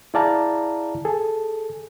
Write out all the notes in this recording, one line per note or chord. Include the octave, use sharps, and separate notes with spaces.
E4 G#4 D5 F5 A5 A#5
G#4 A4